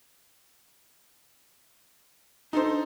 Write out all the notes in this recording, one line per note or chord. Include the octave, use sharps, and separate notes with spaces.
D4 D#4 A4 C5